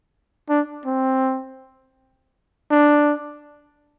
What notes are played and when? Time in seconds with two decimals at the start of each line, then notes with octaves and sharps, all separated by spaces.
0.49 D4
0.86 C4
2.71 D4